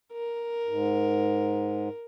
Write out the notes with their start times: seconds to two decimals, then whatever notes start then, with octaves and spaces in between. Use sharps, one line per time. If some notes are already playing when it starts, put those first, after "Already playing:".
0.13 A#4
0.66 G#2